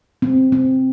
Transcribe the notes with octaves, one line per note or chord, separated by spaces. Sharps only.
C4
C4